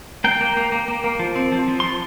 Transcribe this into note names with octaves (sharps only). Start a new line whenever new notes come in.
A#3 G5
A#3
A#3
A#3
A#3
A#3
F3
C4
F3
F3
C6
F3